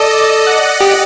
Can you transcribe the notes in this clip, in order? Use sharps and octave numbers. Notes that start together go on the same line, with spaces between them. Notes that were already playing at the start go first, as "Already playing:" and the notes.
Already playing: A4 D5 D#5
D5
F#5
G4